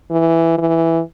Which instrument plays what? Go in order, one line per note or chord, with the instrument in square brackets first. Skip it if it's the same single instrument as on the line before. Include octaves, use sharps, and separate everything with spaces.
[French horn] E3
E3